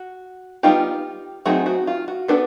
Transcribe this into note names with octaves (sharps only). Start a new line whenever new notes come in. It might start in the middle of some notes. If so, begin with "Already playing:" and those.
Already playing: F#4
G3 B3 D#4 F4 G4
F#3 A3 C4 D#4 F#4 G#4
F#4
F4
F#4
B3 D4 A4 B4